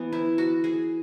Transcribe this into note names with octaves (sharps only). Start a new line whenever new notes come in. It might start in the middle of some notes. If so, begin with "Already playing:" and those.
Already playing: E3 B3
E4
F#4
G#4